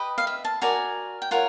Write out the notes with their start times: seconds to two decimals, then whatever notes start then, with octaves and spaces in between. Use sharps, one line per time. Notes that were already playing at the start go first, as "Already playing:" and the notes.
Already playing: G4 B4 D#5
0.18 F5
0.27 E5
0.45 A5
0.62 F#4 A#4 D5 G#5
1.22 G5
1.31 F4 A#4 C#5 F#5